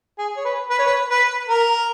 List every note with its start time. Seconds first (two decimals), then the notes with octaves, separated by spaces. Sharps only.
0.18 G#4
0.37 C#5
0.45 B4
0.70 B4
0.79 C#5
0.86 B4
1.10 B4
1.49 A#4